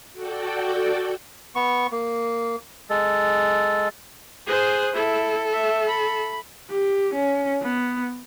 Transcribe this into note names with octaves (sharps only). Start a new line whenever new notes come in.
F#4 A4 D5 G5
B3 C#6
A#3
G#3 A4
G#4 C5 D#6 F#6
E4 A4
E5
B5
G4
C#4
B3